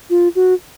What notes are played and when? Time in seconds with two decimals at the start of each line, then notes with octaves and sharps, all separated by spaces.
0.10 F4
0.35 F#4